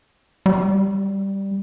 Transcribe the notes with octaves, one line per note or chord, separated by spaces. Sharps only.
G3